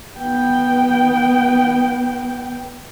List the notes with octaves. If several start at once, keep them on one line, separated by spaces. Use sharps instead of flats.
B3 G5